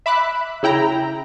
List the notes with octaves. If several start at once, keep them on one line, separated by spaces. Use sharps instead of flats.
E5 B5 D6 F#6
C#3 E4 G5 A#5